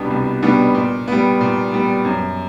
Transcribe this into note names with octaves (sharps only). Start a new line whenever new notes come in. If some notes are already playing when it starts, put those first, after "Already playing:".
Already playing: C2 B2 G3 B3 D4
C2
B2 G3 B3 D4
A#2
G3 B3
A#2
G3 B3
F#2